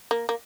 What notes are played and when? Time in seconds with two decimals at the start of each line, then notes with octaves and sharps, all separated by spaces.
0.11 A#3
0.29 A#3